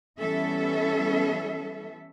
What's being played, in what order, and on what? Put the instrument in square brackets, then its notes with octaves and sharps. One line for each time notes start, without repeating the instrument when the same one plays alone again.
[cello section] E3 G3 B3 C#4 A4 E5